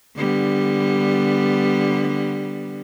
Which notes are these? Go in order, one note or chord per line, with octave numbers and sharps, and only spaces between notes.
D3 G3 B3